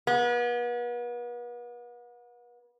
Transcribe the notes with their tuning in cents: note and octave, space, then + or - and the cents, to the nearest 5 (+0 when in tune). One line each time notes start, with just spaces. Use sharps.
B3 -40